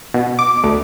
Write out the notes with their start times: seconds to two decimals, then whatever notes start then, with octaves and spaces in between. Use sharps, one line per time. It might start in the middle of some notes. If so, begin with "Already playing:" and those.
0.14 B2
0.39 D6
0.63 D2